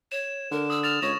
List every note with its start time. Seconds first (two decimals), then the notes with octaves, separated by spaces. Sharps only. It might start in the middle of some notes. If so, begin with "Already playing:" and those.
0.12 C#5 E7
0.51 D3 A#4
0.70 D#6 E6
0.83 F6 A6 E7 F7
1.02 C#2 C#5 C#6 A#6 E7